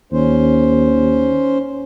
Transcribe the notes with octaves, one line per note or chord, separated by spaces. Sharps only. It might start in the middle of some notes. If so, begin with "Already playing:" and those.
D#2 C#4 C5